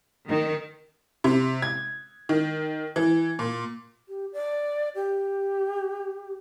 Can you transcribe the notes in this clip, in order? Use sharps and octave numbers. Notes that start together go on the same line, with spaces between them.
D#3
C3
G#6
D#3
E3
A#2
G4
D5
G4